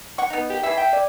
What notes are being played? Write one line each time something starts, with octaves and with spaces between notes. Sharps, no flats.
F#5 C#6
B3 D#4
G4
E3 G#4 E5
G5
D5